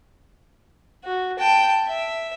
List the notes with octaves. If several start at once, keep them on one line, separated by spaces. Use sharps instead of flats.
F#4
G5 A5
E5